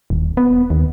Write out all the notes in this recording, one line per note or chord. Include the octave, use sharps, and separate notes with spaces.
D#1
B3
D#2